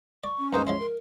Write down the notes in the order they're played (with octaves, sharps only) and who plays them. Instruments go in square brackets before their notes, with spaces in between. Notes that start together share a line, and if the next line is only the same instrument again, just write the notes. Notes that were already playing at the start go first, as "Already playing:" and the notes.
[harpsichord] D5 [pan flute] C#6
[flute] C#4
[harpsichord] G2 G#3 A#3 [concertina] D#4 C5 [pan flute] B4
[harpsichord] F3 G#3 E4 [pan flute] C#5 [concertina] C6
[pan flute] A#4